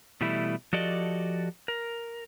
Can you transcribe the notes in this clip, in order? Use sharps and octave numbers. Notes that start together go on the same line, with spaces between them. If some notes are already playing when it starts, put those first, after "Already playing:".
B2 E3 G3 A3 E4
F3 F#4 G4 A4 D5 D#5
A#4